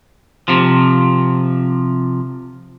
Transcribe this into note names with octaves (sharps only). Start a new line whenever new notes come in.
C3 F3